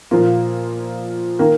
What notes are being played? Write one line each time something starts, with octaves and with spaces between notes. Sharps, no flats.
A#2 F3 A#3 F4
D#3 A#3